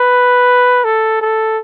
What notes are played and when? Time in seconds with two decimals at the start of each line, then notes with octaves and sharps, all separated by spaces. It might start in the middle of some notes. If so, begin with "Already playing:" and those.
Already playing: B4
0.85 A4
1.21 A4